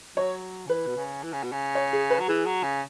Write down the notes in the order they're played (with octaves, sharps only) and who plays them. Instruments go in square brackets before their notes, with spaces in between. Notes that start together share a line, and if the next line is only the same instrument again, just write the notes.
[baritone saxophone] F#3 [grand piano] C#5
[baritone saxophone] C#3
[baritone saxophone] E3 [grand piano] B4
[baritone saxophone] B2
C#3
E3
C#3
B2
C#3
[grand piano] C#5
G#4
B4
[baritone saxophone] F#3
[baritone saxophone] E3 [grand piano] G#4
[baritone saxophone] F#3
C#3